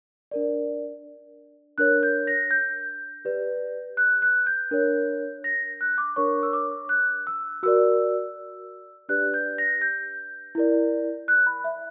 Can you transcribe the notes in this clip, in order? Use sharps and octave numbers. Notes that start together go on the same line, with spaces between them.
D4 A#4 D5
D4 A#4 C#5 F#6
G6
A#6
G6
G4 B4 D5
F#6
F#6
G6
D4 A#4 C#5
A#6
F#6
D6
D4 A#4 C#5 C#6
E6
D6
F#6
E6
F#4 A#4 D5 E6
D4 G4 B4 D5 F#6
G6
A#6
G6
E4 A#4 D5
F#6
B5
E5